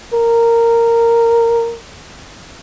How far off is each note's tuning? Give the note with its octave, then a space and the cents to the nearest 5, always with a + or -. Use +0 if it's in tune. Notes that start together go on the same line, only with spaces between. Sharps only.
A#4 -10